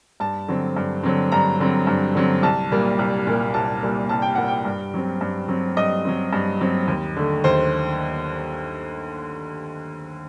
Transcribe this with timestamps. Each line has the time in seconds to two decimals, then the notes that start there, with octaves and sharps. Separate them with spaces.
0.20 G2 A5
0.48 D3 F#3 C4
0.77 G2
1.03 D3 F#3 C4
1.32 G2 A#5
1.60 D3 F#3 C4
1.87 G2
2.15 D3 F#3 C4
2.43 C2 A5
2.71 A#2 G3 A#3
2.99 C2
3.27 A#2 G3 A#3
3.54 C2 A5
3.83 A#2 G3 A#3
4.09 C2 A5
4.22 G5
4.35 A#2 G3 A#3 F#5
4.48 G5
4.65 G2
4.94 F#3 C4
5.21 G2
5.48 F#3 C4
5.77 G2 D#5
6.05 F#3 C4
6.33 G2
6.61 F#3 C4
6.87 D#2
7.16 D3 A3
7.44 D#2 C5